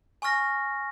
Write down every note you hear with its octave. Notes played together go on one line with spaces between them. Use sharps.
G#5 C#6 F6 A#6